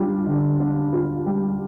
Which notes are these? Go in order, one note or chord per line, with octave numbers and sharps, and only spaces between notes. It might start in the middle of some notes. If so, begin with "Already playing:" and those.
Already playing: G3 D4 F4
D3
D4
F4
G3